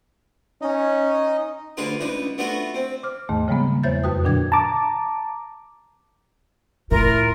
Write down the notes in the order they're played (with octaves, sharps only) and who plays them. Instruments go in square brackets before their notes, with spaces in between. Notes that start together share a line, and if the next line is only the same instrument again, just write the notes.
[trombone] C#4 [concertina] D#4 D#5
[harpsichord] D2 D3 F4 G#4 B4 C6
C#2 D4 D#4 B4
A3 B3 D4 F4 F#4 A4
C4
[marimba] D6 F6
D#2 G#2 D#3 A3
C#3 F3 G3 G#3 A#3 B3
E2 C5 C#5 E5 G6 A6
F2 F#4 B4 G5 D#6
A#2 D3 F#3 D4 G5 G#6
[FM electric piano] A5 A#5 D6
[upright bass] D#2 A2 [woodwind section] E4 F4 A#4